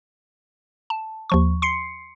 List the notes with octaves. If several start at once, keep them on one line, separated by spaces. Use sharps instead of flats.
A5
D#2 F3 C#6
C6 C7 C#7